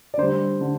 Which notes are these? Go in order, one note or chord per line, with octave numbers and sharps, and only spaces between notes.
D5
D3 G3 C5
D3 G3